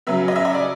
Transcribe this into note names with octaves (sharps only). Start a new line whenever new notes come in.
C#3 F#3 B3 E5
D#5
E5
D#5
D5